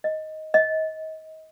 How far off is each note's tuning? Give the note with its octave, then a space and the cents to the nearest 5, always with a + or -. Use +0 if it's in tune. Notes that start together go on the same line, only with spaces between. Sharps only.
D#5 +10
D#5 +30